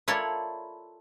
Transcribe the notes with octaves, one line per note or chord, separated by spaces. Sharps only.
E4 F4 A4 A#4 C#5 D5